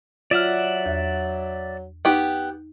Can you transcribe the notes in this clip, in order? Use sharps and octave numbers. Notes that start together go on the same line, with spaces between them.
F#3 F4 D5 E5 F#5 F6
E2
B3 D#4 G4